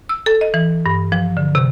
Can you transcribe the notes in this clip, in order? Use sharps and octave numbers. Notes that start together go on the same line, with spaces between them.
E6
A4
D#5
E3
G2
F3
D3
C3